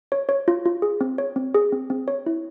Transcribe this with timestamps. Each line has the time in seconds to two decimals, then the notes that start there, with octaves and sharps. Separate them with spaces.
0.12 C#5
0.29 C#5
0.48 F4
0.65 F4
0.82 G#4
1.01 C4
1.18 C#5
1.36 C4
1.54 G#4
1.72 C4
1.90 C4
2.08 C#5
2.26 E4